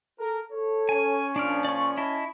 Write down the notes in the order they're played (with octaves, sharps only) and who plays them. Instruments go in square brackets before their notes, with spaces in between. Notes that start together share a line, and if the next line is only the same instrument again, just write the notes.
[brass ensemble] A4 A#4
A4 C#5
[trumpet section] C#4 [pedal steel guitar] G#5
[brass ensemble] A#2 F3 [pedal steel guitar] D4 D5 F6
[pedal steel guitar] D5 C#6
E4 D#5 A5